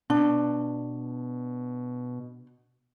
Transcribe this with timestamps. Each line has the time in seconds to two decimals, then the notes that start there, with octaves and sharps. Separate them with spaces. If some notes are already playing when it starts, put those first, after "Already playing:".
0.10 B2 D4